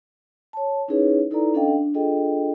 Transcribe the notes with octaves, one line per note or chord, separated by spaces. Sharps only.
C#5 A5
C#4 D#4 E4 G#4 B4 C#5
D#4 E4 A4 B4 D5 A#5
C#4 D4 A4 D#5 F5 G5
D4
D4 F4 G#4 A4 D#5 G5